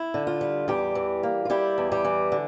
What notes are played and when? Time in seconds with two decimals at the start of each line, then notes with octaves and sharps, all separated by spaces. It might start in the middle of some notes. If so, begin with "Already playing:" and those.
Already playing: E4
0.14 D3
0.27 F4
0.41 G3
0.68 E2 G3 G4
0.95 E3
1.23 A#3
1.45 F4
1.50 G3 E4 G4
1.78 E2
1.92 G3 G4
2.05 E3
2.32 D3